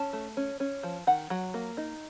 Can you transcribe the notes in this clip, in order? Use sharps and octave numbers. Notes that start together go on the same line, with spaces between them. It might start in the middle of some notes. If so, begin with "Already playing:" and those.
Already playing: C#4 A5
A3
C#4
C#4
F3
D#3 F#5
F#3
A#3
D#4